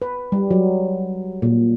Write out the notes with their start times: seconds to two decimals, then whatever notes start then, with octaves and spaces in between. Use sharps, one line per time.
0.02 B4
0.32 G3
0.51 F#3
1.42 A#2